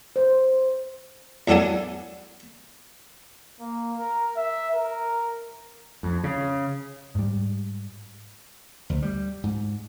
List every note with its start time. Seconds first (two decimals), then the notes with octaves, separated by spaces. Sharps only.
0.16 C5
1.48 E2 F#3 D4 A4 F#5 G#5
3.60 A#3
3.98 A#4
4.37 E5
4.75 A#4
6.03 F2
6.24 C#3
7.15 G#2 G3
8.90 D2
9.02 G3
9.43 G#2